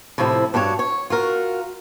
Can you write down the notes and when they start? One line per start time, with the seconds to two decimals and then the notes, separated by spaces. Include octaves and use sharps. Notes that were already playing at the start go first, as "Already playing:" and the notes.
0.18 A2 C3 F3 E4
0.54 G2 D4 F#4 C#5
0.79 C#5
1.10 F4 F#4 A#4